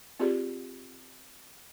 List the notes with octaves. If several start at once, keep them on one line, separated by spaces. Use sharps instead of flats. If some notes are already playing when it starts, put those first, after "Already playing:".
C4 F4 G4 G#4 D5